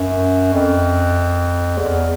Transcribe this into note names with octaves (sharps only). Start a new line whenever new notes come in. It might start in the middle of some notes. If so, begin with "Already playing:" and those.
Already playing: F#2
F2
E2